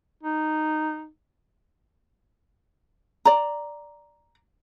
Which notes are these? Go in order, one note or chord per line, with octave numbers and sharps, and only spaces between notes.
D#4
D5 A#5